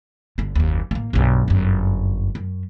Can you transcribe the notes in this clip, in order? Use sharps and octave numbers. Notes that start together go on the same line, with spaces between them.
G1 D3
F#1 D#2
A1 A#3
B1 G2
G1 F#2
F#2